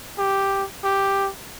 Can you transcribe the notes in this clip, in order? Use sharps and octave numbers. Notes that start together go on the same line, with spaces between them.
G4
G4